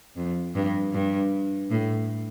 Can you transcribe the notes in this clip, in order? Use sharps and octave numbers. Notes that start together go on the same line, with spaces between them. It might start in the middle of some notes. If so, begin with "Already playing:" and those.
F2
G2
G2
A2